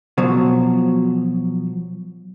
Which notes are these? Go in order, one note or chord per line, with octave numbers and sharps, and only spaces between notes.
B2 F3 F#3